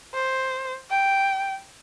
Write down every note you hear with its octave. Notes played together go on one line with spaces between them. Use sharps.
C5
G5